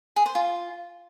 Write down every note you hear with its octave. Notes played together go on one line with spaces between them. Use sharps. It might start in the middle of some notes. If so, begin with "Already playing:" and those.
G#4
C5
F4